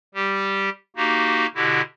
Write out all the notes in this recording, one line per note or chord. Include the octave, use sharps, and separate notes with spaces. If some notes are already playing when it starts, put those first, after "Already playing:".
G3 G4
A#3 D#4 F#4 G4
B2 D3 E4 F#4 G4